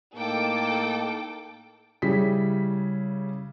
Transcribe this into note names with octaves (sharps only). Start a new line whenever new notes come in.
A2 A#3 D#4 A4 G5 D6
C#3 G3 E4 G#4 B6